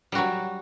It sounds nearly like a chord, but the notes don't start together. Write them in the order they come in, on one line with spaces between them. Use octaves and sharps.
G3 F#4 F#3